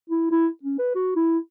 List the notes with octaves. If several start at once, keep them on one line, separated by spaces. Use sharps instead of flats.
E4
E4
C#4
B4
F#4
E4